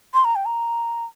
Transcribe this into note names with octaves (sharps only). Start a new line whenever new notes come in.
C6
A#5
G5
A#5